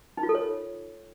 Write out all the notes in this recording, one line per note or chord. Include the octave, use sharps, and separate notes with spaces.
D#4
F4
A4
C#5